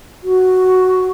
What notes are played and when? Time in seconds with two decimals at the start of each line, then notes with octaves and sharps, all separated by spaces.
0.23 F#4